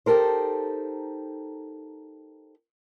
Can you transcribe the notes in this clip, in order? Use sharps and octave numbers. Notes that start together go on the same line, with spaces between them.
D#4 G4 A4 A#4 C5